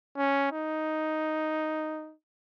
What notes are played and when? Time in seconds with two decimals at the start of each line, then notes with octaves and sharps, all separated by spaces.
0.17 C#4
0.52 D#4